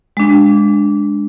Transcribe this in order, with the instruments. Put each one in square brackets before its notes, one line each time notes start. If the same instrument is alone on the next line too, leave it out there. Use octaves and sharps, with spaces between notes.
[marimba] G#3 D4